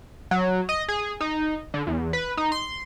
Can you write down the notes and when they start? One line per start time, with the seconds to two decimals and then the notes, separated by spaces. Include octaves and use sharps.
0.31 F#3
0.69 D#5
0.88 G#4
1.20 D#4
1.74 D3
1.87 E2
2.13 B4
2.37 D#4
2.52 C6